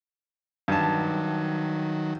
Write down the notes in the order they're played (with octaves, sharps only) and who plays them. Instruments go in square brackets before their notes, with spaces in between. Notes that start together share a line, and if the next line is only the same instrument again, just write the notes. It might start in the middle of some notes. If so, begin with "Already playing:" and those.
[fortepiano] G2 A5 [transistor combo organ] D#3 F#3